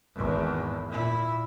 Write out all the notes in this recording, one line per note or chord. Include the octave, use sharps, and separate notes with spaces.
G#1 E2
A#2 E4